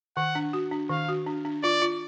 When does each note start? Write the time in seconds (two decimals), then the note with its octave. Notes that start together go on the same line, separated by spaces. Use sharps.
0.17 D#3 F#5
0.35 D4
0.53 F#4
0.71 D4
0.89 D#3 F5
1.09 F#4
1.26 D4
1.45 D4
1.63 F4 D5
1.82 F4